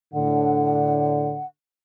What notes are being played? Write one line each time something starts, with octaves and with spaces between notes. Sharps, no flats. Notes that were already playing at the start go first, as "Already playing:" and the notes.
A2 D3 F#5